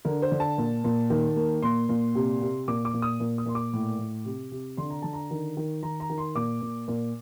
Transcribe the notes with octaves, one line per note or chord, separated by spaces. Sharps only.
D3 A#4
C5
D3
A5
A#2
A#2
D#3
A#3
A#2 C6
A#2
C3
C3
A#2 D6
D6
A#2
D#6
A#2
D#6
A#2 C6
D6
A2
A2
C3
C3
D3 C6
A#5
D3 A5
A#5
D#3
D#3
D#3 A#5
A#5
D#3
C6
A#2 D6
A#2
A#2